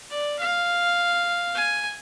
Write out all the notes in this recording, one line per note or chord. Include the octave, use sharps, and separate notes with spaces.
D5
F5
G#5